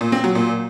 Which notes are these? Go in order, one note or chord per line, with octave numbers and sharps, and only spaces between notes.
A#2
C4
F#3
A#2